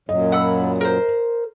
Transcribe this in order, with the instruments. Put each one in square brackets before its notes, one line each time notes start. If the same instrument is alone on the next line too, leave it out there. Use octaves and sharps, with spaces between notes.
[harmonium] F#2 A#2 F#3 [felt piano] D#5
[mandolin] F#5 B5 E6
A#4 C5